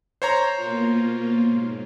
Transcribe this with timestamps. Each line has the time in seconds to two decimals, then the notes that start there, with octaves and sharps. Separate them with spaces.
0.22 C5 C#5 A#5
0.56 B2 A#3 F4
1.49 G#2